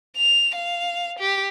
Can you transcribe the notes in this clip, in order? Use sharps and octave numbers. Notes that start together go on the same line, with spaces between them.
F7
F5
G4